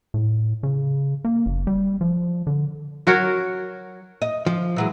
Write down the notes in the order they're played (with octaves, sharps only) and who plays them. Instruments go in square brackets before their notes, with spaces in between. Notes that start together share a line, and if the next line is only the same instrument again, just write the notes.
[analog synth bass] A2
C#3
A#3
F#1
G3
F3
D3
[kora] F#3 F#4 A#4 C#5
[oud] D#5
[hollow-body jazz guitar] F3
[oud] E3 F#3 G#3